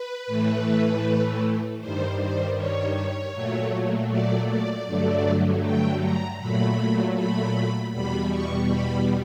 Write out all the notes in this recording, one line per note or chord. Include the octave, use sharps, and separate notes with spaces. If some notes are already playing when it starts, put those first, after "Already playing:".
Already playing: B4
A2 E3 A3
G2 D#3 G3 C5
C5
C#5
A#2 F#3 A3
D5
D5
G2 D3 F#3 A3
G5
A#5
A#2 F#3 A3 B5
B5
E2 B2 G3 B5
C#6
B5